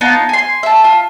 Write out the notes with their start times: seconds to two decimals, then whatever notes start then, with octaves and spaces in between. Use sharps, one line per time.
0.01 B3 D#4 F4 A5
0.29 G#5 C6
0.63 E5 A5
0.84 F4